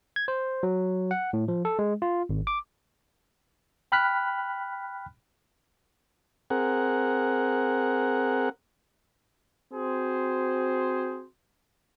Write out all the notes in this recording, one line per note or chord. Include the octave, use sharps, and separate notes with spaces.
G#6
C5
F#3
F#5
A2
F3
A4
G#3
F4
G#1
D6
G5 B5 F6 F#6 B6
C4 G#4 A#4 F#5
C4 F#4 G#4 C5